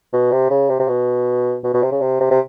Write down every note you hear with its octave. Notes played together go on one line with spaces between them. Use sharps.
B2
C3
C#3
C3
C3
B2
B2
B2
C3
C#3
C3
C3
C3